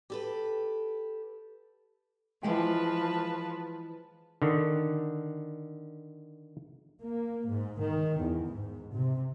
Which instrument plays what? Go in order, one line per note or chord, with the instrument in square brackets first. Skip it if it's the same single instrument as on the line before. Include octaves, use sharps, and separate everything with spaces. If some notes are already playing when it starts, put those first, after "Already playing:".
[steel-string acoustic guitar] G4 A4 B4
[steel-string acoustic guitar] E3 G#3 G5 [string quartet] F3 B4 A5
[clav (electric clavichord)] D3 D#3
[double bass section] A#3
G#2
D#3
E2
G#2
C3